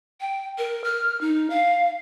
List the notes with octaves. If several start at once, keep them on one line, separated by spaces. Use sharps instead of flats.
G5
A#4
F6
D#4
F5